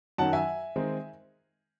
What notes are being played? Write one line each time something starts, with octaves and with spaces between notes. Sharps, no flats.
F#2 D#3 F#3 C#4 F#5 A5
E5 G#5
D#3 G#3 C4 D#4